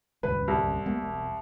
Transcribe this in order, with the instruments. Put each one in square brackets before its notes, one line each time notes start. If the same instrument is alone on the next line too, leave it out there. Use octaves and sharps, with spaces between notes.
[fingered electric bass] D#1 C#2 G2 [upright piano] B4
[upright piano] C2
[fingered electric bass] G#3 A#3 B3
E1